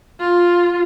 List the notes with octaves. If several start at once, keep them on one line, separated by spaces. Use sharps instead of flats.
F4